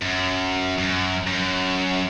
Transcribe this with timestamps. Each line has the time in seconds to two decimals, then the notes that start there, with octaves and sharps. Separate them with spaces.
0.02 F#2
0.78 F#2
1.27 F#2